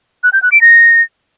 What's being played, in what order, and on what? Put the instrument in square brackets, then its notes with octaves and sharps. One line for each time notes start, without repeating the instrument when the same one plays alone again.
[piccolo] F#6
G6
F#6
D7
A#6